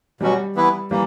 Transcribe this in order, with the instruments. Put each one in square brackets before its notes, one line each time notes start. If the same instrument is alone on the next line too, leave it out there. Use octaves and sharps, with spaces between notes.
[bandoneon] B2 F#3 C#4 F#4 [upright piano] G3
[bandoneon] E3 B3 E4 B4
[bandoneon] E3 A#3 [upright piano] G3